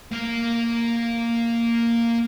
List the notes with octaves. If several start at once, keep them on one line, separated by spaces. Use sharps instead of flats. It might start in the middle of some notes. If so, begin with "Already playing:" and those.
A#3 F5